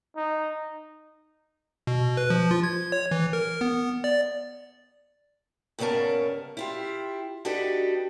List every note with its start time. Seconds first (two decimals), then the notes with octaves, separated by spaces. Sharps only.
0.16 D#4
1.87 B2
2.17 B4
2.30 F3
2.51 F4
2.63 G#6
2.92 C#5
3.11 E3
3.33 A#4
3.61 B3
4.04 D5
5.79 G2 C#3 B3 C#4 A#4 A5
6.57 E4 F4 G4
7.45 D4 D#4 F#4 G4 A4 B4